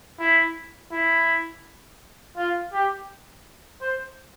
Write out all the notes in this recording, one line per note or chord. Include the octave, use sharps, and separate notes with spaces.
E4
E4
F4
G4
C5